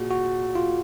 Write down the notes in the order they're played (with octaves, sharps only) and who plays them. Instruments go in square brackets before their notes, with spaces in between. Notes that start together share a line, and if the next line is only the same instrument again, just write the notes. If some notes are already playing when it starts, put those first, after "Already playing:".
Already playing: [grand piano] A#2 [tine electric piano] F#4 G#4
[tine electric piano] F#4
F4